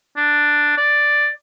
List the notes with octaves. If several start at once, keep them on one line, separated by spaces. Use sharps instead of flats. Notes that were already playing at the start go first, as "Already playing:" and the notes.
D4
D5